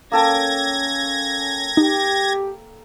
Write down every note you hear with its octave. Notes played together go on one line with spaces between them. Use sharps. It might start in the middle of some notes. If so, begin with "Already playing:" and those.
A#3 C#4 A4 G5 G#6 A#6
D#4 G4